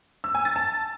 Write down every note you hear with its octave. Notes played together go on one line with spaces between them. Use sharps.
E6
G#5
A6
A5